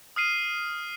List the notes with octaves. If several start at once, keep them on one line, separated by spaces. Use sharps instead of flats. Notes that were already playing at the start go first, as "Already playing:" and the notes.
D#6 F6 C7 D#7